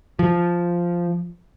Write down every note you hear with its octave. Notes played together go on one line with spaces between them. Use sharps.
F3